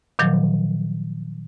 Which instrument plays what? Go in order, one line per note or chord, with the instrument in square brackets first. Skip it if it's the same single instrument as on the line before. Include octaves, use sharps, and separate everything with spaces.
[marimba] A#2 D#3 F3 F#3